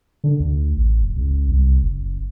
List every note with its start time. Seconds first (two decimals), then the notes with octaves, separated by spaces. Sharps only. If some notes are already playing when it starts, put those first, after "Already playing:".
0.24 D3
0.40 D2
0.77 A1
1.02 F1
1.16 C#2
1.49 C2
1.83 F#1